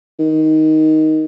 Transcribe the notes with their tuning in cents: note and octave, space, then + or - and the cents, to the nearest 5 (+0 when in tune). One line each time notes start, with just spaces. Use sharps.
D#3 +10